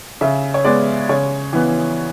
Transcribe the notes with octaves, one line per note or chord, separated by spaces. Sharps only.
C#3 E5
C#5
G#3 B3 D5
C#3 C#5
E3 B3